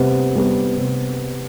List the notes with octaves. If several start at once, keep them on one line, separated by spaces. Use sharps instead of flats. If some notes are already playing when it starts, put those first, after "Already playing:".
Already playing: C3 G3 B3
G3 B3
C3